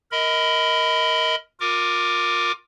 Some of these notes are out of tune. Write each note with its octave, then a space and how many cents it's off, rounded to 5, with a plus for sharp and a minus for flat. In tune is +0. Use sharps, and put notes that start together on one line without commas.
A#4 +0 D#5 +25 B5 +20
F4 +30 A#4 +0 D6 +10